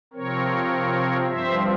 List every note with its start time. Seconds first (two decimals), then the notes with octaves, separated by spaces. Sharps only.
0.13 C3 F3 C4 A#4 C#5
1.29 G2 F3 C4 C5 E5